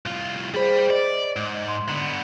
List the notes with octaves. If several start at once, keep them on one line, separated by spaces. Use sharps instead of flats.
C2 F4
G3 G#4 C5 B5
D5 D#5
G#2
C6
D3 B3 A#5